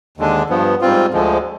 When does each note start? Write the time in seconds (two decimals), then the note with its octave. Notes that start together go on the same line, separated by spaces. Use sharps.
0.18 D#2 D3 G#3 D4
0.49 G2 F3 B3
0.81 G#2 G3 C4 F4
1.13 D2 D3 F3 G#3